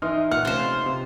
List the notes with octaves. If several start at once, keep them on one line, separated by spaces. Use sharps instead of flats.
E3 D#4 C6 D#6 F6
A#2 F#5 F6
C3 A3 C#4 F4 C5
D#4
C3